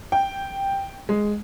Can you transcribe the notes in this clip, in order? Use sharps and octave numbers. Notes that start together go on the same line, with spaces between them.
G5
G#3